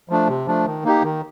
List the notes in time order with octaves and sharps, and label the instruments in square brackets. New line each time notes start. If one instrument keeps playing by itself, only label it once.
[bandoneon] F3 A3 D4
C3
F3 A3 D4
D#3
A#3 D#4 G4
D#3